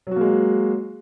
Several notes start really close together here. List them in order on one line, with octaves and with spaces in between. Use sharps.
F#3 F#4 A#3 G#3